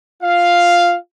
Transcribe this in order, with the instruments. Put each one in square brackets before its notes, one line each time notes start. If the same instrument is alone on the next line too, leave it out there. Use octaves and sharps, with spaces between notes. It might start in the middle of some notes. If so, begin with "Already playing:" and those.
[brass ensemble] F4 F5